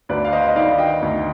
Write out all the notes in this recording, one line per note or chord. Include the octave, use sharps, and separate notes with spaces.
D2 B4 D5
F5
C5 D#5
D#5
D#3 D5 F5
D#5 G5
D2